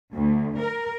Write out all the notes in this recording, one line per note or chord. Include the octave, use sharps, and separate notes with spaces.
D2
A#4